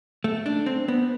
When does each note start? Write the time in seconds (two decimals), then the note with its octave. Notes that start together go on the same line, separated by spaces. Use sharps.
0.24 A3
0.46 D4
0.66 C4
0.88 B3